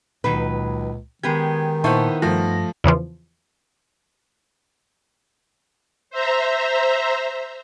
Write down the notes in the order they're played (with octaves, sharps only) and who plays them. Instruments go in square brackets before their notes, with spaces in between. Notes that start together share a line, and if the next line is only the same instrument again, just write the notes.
[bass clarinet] C#2 [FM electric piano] A#2 [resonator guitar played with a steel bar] D#3 F#3 B4
[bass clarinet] D#3 [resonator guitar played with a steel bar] G#3 B3 G4 [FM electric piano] G#6
[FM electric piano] A#2 A5 C#6 [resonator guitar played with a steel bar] B3 D#4 [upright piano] E4 C5
[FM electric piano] G2 A#6 [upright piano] F3 A3
[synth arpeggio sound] E2 C#3 E3 F3
[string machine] C5 E5 A#5